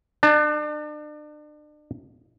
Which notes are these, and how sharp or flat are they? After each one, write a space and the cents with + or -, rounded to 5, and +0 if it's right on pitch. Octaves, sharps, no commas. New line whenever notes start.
D4 +35 A5 +0